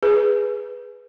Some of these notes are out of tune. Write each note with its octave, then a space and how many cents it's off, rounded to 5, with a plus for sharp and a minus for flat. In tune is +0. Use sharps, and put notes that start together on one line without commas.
G#4 +0 B4 +0